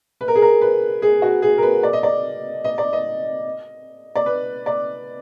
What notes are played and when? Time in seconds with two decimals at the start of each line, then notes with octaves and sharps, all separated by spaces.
0.21 B4
0.28 A#4
0.35 G#4
0.42 A#4
0.61 B4
1.02 G#4
1.22 F#4
1.42 G#4
1.58 A#4
1.63 B4
1.83 D5
1.93 D#5
2.03 D5
2.64 D#5
2.78 D5
2.93 D#5
4.16 D5
4.26 B4
4.66 D5